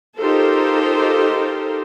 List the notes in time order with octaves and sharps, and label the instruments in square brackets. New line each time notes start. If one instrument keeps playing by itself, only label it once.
[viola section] D#4 F4 G4 A4 A#4 C5